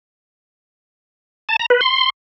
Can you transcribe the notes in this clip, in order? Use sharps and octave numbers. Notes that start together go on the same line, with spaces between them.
A5
A#5
B4
C6